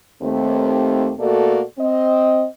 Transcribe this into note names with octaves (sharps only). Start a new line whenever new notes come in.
D#2 A3 C4
B2 A3 A#3 F#4 A4 D5
C4 D#5